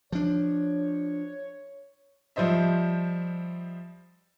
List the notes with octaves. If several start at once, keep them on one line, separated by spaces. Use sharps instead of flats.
F3 D4 C#5
F3 G3 C5 D#5 E5